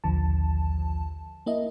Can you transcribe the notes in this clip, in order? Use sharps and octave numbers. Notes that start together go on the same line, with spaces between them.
A#1 D#2 D3 F3 A5
A#3 E4 D#5